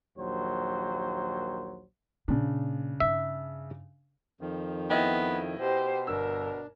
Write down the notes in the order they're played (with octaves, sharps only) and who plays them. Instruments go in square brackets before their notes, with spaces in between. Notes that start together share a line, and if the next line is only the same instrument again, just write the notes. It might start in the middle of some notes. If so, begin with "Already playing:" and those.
[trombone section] A#1 D#2 F#3 C5
[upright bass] A#2 [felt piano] C#3 D4
[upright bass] G2 D#4 [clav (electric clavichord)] E5
[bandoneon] F2 D#3 F3
[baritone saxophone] B3 [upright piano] E4 D#5 G5
[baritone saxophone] B2 [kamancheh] G4 C5
[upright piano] G1 E6 [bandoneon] D4 [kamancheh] A#4